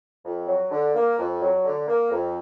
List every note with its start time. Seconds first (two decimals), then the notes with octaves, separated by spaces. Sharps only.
0.25 F2
0.48 F#3
0.71 D3
0.95 A#3
1.18 F2
1.42 F#3
1.64 D3
1.87 A#3
2.11 F2